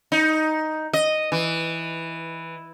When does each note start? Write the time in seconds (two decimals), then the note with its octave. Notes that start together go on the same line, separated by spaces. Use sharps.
0.12 D#4
0.93 D#5
1.32 E3